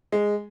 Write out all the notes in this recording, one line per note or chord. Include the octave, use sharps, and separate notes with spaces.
G#3